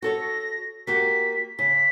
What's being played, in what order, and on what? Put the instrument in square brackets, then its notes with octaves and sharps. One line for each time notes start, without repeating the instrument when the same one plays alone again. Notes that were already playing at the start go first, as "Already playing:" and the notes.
[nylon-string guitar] F#4 A4 C#5 [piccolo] A#6
[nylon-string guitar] A#3 F#4 G4 [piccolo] B6
[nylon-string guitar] C#3 [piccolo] B6